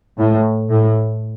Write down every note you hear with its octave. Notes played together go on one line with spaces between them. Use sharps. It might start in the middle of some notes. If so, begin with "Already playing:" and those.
A2
A2